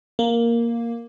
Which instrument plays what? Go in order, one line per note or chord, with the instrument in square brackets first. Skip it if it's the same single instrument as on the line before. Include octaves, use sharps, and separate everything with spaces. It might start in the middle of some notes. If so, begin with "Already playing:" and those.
[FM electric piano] A#3